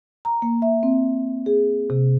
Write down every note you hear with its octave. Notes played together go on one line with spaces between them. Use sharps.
A#5
A#3
E5
C4
G#4
C3